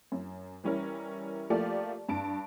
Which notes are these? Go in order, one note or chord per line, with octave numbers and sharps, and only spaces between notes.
F#2
E3 G3 C#4 E4 A#4
F3 A3 A#3 F4 G4 D5
G2 A5 D7